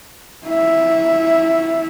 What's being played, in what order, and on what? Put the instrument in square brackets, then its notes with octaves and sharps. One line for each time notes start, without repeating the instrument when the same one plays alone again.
[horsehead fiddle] E4 E5